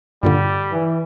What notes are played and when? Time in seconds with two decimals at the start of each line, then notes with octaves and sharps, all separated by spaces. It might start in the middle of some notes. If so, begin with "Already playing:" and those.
0.23 G2 A#2 D3 G3
0.72 E3